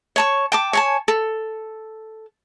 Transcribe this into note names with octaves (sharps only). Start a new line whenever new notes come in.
C#5 A5 C#6
G5 A5 D6
C#5 G#5 A5
A4